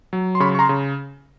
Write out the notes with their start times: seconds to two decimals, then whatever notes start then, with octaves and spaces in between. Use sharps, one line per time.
0.13 F#3
0.35 C6
0.40 C#3 B5 C#6
0.55 C#6
0.59 A#5 C6
0.69 C#3